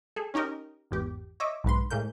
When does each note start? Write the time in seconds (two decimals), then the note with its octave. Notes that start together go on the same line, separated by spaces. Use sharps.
0.16 G#4 A4
0.34 C#4 D#4 G4 A#4 D#5
0.91 G#1 E2 G4
1.40 C#5 D#5 E5 D6
1.64 B1 G#2 B4 C6
1.91 A2 G#3 A#3 G6